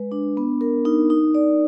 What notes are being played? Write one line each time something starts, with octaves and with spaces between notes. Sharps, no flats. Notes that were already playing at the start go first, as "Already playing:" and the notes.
Already playing: G#3 B4
D4
B3
A#4
D#4
D#4
D5